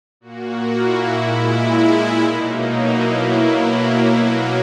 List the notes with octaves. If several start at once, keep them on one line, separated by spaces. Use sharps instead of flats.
A#2 A#3 F#4
E4
A#2 G#3 E4
E4
B2 F#3 A#3 D#4
E4
B2 F#3 A#3
B2 F#3 A#3 F#4